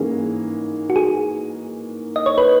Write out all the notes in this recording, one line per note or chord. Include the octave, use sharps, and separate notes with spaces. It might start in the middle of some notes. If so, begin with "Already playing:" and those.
Already playing: G#2 E3 A#3 C#4 G#4
F#4
G#4
D#5
C#5
B4